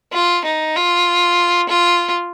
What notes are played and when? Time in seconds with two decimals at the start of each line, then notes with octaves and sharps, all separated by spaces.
0.13 F4
0.45 D#4
0.76 F4
1.69 F4